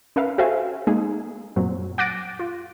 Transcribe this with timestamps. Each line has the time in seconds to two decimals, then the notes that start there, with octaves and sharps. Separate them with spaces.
0.16 C#4 A#4 B4 E5 F5
0.38 F#4 A4 C5 E5 F5 G#5
0.87 G#3 A#3 D#4 G#4
1.56 F#2 A#2 F#3 C4
1.98 F#5 D6 F#6 A6 A#6 D7
2.39 F4